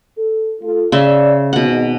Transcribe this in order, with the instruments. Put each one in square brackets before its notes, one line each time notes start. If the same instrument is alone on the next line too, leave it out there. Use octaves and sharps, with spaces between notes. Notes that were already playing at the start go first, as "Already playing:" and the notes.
[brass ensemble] A4
A3 F4 A4
[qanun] C#3 E5 [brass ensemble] D5
[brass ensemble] G#1 G#2 [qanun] B2 F#5